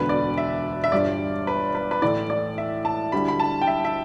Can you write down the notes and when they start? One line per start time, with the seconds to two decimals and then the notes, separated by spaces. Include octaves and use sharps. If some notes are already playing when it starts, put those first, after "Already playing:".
Already playing: E1 D2 D3 B3 B4
0.09 D5
0.38 E5
0.84 E5
0.92 G1 G2 G3 D4 D5
1.47 B4
1.75 B4
1.91 B4
2.02 A2 E3 A3 D5
2.30 D5
2.58 E5
2.85 A5
3.12 D2 D3 G3 E4 B5
3.28 B5
3.40 A5
3.61 G5
3.67 E5
3.85 E5